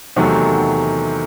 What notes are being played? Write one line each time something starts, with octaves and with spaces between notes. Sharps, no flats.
E2 C3 D#3 F#3 A3